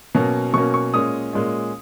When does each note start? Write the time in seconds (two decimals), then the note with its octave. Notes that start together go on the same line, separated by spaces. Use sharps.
0.14 B2 F#3 A#3 C#4
0.54 B2 F#3 A#3 C#4 C#6
0.74 C#6
0.94 A#2 G#3 C#4 D#6
1.33 A#2 G#3 C#4